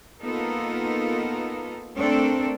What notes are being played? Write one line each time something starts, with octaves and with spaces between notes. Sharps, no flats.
A#3 B3 D#4 F4 A4 A#4
A3 C4 D4 A4 A#4